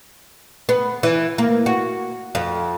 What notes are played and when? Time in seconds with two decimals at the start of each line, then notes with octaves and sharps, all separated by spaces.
0.69 B3
1.03 E3
1.38 A#3
1.66 F#4
2.35 F2